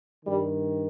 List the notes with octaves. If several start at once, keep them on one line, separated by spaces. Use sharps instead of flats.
G2 D#3 G3